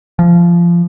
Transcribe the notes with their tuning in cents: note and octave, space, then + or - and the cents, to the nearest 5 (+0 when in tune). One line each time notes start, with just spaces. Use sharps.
F3 -20